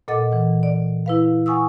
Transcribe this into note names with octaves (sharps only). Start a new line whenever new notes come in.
A#2 A4 D#5 F#5 D6 A6
E3 F#5
D5
E4 B4 F5
F#5 G#5 C#6 D#6 E6